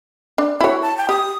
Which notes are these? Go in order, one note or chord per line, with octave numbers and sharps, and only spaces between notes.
D4
E4 F#4 C#5
A5
G5
G4 D#6